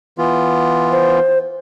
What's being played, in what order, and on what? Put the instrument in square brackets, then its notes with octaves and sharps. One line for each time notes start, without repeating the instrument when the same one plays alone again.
[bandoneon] E3 B3 F4
[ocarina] C5